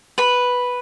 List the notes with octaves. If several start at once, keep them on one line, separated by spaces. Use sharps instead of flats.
B4 B5